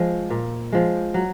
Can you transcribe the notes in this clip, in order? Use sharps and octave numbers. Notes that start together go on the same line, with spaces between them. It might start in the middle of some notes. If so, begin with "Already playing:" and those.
Already playing: F3 G#3
A#2
F3 G#3
F#3